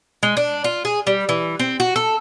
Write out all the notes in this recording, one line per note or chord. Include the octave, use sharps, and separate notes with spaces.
G#3
D4
F4
G#4
G3
E3
C4
F#4
A4